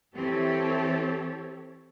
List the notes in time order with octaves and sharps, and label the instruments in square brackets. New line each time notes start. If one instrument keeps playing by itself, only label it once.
[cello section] E3 C4 G4 A4 C#5